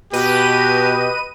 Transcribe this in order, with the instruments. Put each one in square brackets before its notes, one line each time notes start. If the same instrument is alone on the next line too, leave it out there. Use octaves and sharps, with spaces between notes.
[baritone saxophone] B2 [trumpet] G4 [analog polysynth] B4 D#5 D#7